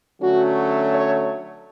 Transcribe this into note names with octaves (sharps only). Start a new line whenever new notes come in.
D3 F#3 A3 C#4 F#4
C#5